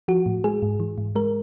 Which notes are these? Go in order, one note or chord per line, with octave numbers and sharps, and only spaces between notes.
F3 F#4
A2
G#3 G#4
G#2
E3
G#2
G#3 A#4